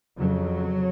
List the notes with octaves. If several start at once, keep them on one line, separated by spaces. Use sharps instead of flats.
F2 C#3 F#3